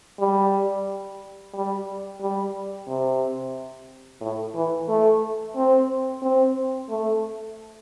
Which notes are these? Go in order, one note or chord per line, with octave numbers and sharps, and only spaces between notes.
G3
G3
G3
C3
A2
E3
A3
C4
C4
A3